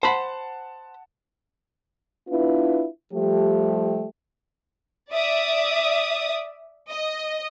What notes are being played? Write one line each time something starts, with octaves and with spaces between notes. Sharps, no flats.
C5 F#5 A5 B5
B3 D4 E4 F4 B4
F3 G3 A3 G4
D5 E5 D#6
D#5